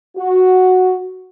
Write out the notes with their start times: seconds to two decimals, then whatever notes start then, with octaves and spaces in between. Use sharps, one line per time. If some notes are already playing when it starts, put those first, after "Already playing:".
0.17 F#4